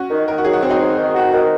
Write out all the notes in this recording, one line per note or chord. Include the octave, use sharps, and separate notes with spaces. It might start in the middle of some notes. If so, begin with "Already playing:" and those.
Already playing: C#4 F#4
D#3
D#3 A#4
F#4
F#3 G#4
F#4
G#2 C4
D#4
D#3
D#3
F#4
D#3